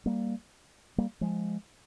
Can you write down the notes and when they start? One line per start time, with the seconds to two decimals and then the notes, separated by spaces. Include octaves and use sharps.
0.06 G3 A#3
0.98 G3 A#3
1.21 F3 G#3